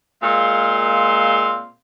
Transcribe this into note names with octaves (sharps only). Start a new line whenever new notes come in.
A#2 G#3 C4 F5 C6